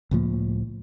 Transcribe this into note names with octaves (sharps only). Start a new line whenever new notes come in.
C#2 A2 F3 A#3